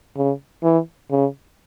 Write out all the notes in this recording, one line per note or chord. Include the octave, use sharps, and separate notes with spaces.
C#3
E3
C#3